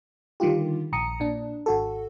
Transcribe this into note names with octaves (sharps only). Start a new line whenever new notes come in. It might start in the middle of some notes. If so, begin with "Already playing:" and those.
D3 D#3 G3 F4 G4
A#1 A#5 D#6 C#7
A#2 D4
G#1 F#4 A4